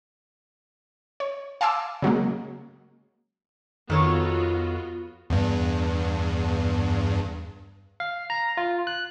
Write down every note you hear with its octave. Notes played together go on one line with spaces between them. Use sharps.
C#5
F5 G#5 A5 C6 D6 E6
C#3 F#3 G#3 A#3
F2 D#3 B3 F4 F#4 A4 C#5
E2 G2
F5
A#5
F4
F#6